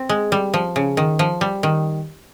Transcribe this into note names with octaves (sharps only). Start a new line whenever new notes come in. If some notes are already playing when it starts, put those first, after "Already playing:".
Already playing: C4
G#3
G3
F3
C#3
D#3
F3
G3
D#3